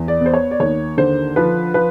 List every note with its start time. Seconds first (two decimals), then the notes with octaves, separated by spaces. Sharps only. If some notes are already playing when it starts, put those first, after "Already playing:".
Already playing: E2
0.08 D5
0.21 B3 C5
0.34 C#5
0.51 D5
0.60 D#2 C#5
0.97 D3 C5
1.36 F3 B4
1.74 F3 B4